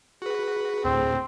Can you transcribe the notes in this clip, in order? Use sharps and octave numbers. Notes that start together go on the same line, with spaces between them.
F#4 G#4 B4
D2 A2 C4